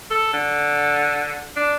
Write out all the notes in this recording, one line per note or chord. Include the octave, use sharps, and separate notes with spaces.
A4
D3
D4